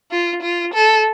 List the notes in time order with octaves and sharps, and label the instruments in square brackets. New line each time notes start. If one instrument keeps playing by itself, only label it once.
[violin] F4
F4
A4